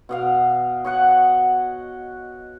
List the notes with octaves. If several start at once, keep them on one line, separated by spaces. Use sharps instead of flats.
B2 D#5 F5
C#5 D#5 F#5